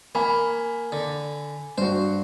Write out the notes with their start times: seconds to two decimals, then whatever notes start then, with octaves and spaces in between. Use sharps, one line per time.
0.15 A#3 G#5 B5
0.92 D3
1.78 G2 F#4 C5